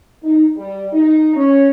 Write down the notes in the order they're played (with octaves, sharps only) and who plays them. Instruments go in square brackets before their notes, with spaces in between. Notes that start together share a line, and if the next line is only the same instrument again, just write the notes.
[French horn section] D#4
G3
D#4
C#4